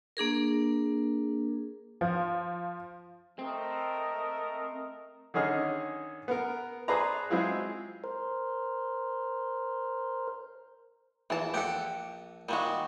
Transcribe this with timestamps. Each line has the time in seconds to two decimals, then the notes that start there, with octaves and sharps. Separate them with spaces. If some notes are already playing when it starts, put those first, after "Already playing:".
0.17 A#3 D4 G#4 A#4
2.01 F3
3.39 A3 C4 A#4 D#5
5.34 D3 D#3 C#4 G#4 D#5 F6
6.28 B3 A#4
6.88 G#4 B4 C5 D5 A5 A#5
7.30 F#3 G#3 C4 E4 F4 G#4
8.04 A#4 C5
11.30 A#1 E2 E3 A5
11.54 A#1 G4 A4 D5 F#5
12.49 A#2 D#3 G3 G#3 F#4